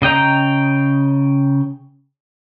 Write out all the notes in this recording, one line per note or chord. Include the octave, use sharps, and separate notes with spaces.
C#3 D#5 G5 A#5